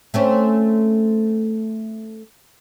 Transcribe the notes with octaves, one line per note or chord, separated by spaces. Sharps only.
A3 C4 C#4